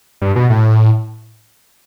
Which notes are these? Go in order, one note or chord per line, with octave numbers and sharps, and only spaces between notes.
G2
B2
A2